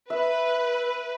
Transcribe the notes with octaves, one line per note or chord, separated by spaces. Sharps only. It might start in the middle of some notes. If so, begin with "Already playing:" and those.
B4 E5